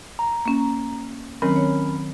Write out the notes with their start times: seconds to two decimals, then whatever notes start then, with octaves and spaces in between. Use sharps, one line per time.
0.19 A#5
0.45 A#3 C#4
1.42 D#3 F#3 C4 C#4 A#4 B5
1.56 C#5